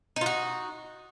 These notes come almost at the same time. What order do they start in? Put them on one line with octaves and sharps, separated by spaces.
D#4 F4 F#4